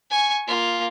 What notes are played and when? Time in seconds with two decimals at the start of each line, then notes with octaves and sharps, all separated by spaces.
0.10 G#5 C#6
0.47 A#3 F4